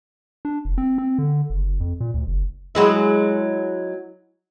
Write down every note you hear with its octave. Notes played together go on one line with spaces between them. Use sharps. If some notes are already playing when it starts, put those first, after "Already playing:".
D4
F1
C4
C4
D3
F#1
F2
A#2
D2
F#1
F#3 G#3 E4